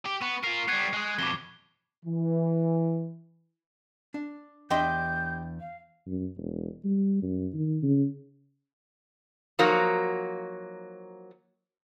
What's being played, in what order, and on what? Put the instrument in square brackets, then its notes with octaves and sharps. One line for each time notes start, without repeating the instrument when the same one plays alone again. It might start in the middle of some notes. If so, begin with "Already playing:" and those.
[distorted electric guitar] G4
[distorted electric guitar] B3 [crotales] C#6
[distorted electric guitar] F4 A#4 [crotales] C7
[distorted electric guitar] G3 B3 [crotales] F#6 G#6 C7
[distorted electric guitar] G#3 G#4
[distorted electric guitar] F2 B2 [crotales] D6 G7
[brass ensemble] E3
[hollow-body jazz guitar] D4
[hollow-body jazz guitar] E2 D4 E5 [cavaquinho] G4 D#5 C6 [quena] G6
[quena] F5
[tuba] F#2
E1
G3
F#2
D#3
C#3
[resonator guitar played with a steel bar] F3 F#3 A#3 D#4 F#4